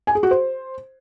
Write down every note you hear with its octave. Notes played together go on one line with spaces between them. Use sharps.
G#5
G#4
F#4
C5